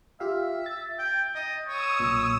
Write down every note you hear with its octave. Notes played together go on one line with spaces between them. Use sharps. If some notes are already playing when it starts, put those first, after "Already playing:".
F4 G4 E5 F5
A6
G5
D#5
C#5 D#6 E6
B1 A#2